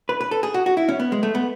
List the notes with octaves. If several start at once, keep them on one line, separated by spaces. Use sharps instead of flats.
B4
B4
A4
G#4
F#4
F#4
E4
C#4
B3
G#3
A3
B3